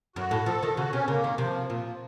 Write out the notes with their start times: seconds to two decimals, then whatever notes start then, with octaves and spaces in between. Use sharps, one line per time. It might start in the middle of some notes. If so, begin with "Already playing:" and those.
0.16 F#2 F#4
0.31 A2
0.46 F3 A4
0.63 D#3
0.77 C#3 F#4
0.92 C3 C#4
1.07 C#3 A#3
1.24 D#3
1.38 C3 F3
1.69 A#2 F3